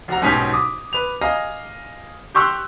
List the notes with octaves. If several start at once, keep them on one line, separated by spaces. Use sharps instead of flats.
F1 F#4 A#5
B1 G#2 B2 C#4 G4 B6
D6 D#6
B4 F7
D#5 F5 G#5 A#5
G4 C6 C#6 E6 F#6